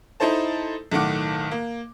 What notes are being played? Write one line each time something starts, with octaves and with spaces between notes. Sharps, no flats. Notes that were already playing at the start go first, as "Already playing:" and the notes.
D#4 E4 A4 C5 A5
B1 A2 D#3 F#5 D6
A#3